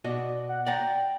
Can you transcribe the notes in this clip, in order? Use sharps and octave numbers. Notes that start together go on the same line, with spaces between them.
B2 F#4 D5 D#5
F#5
D5 F#5 G5 A#5